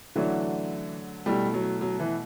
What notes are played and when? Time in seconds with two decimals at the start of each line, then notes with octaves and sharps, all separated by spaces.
0.16 D3 E3 F#3 A3 D4 F#4
1.26 B2 G3 A3 E4
1.54 F#3
1.81 F#3
1.99 E3